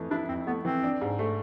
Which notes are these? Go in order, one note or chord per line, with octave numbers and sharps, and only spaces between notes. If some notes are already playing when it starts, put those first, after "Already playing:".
Already playing: F2 E3 A3
D4 E4
F2 C4
A3 B3
E3 C4
D4
G#2
A3